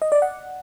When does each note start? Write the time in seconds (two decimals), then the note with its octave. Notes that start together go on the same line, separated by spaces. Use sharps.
0.02 D#5
0.12 D5
0.22 F#5